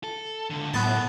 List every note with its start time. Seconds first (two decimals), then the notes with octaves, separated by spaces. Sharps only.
0.04 A4
0.50 C#2 D3
0.74 F#2 A2 B3 A5
0.86 F#2 B2